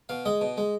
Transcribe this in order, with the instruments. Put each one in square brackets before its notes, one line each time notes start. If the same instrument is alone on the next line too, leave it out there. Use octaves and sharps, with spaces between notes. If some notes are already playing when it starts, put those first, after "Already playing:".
[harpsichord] B2 F5
G#3 D#5
B2
G#3